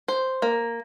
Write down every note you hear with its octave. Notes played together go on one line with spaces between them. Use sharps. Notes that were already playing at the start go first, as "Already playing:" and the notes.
C5
A#3